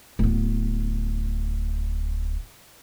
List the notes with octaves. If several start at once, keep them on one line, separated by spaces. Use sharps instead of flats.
D1 B3